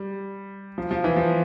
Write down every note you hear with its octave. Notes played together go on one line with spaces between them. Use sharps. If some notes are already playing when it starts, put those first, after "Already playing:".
Already playing: G3
F3
F3
E3
F3